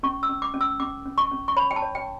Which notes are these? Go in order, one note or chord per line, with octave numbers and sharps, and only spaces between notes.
C#4 C#6
E6
C#4
D6
C#4
E6
C#4 D6
C#4
C#6
C#4
C#6
C#5 B5
G5
A5
C#5
G5